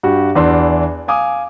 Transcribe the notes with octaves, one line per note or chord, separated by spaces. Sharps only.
G2 F#4 G4
E2 E3 D4 C6
F5 G#5 D6 D#6